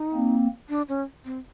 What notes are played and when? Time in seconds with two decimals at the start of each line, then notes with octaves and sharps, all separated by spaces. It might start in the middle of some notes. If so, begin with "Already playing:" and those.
Already playing: D#4
0.14 A#3 C4
0.69 D4
0.89 C#4
1.25 C4